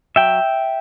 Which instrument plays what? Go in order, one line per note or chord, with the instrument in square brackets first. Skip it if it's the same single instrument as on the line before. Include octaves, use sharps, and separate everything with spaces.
[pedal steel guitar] F#3 E5 G5